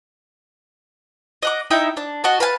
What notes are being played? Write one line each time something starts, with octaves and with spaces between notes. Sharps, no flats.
D#5 F#5 D6
D#4 E4 E5 G5
D4
F#4 D#5 A5
B4 F5 G#5 A5